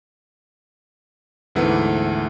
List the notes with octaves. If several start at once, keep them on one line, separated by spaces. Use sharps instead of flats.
D2 G#2 E3 A3 B3